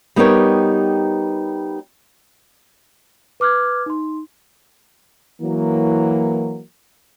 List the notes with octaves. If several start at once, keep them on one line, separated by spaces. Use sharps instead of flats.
G3 B3 D#4 G4 A#4 C#5
B4 D6 F6 F#6 G#6
D#4 C6
E3 F#3 A#3